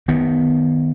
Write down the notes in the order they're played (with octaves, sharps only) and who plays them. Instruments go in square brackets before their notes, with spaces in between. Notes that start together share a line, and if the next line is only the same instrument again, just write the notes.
[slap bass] D#3 B3